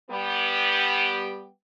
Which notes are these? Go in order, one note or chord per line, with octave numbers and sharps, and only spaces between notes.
G3 B3 G4